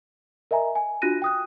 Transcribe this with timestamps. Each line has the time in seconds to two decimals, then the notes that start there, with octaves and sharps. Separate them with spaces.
0.51 A#4 D#5 E5 G#5 A#5
0.75 G#5
1.02 D4 F4 F#4 F#6 A#6 D#7
1.22 G5 D#6 F#6